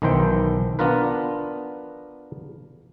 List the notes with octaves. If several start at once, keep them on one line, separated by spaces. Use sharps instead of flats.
B1 D#3 E3 C5 G5
B3 D4 F4 A#4 B4